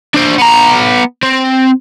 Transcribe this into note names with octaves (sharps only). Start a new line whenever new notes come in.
D4 C5
B3 A#5
C4